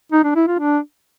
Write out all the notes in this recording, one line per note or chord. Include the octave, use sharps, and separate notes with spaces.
D#4
D4
E4
F4
D4